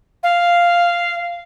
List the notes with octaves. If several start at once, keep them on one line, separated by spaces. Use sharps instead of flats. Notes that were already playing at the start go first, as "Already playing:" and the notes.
F5